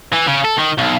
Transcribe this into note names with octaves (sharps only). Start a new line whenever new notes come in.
E3
C#3
A4
D#3
B1